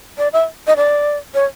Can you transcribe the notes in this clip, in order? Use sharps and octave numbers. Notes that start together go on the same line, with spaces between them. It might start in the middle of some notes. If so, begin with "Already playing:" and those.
D5
E5
D#5
D5
C#5